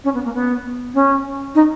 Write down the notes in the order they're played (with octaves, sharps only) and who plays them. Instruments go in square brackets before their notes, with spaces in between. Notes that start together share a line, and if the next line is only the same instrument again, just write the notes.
[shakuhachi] C#4
B3
A#3
B3
C#4
D#4